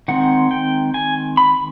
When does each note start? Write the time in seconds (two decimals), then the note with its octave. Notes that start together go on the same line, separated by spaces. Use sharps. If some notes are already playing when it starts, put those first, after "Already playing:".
0.08 D#3 G#3 C4 F#5
0.51 G5
0.94 G#5
1.37 B5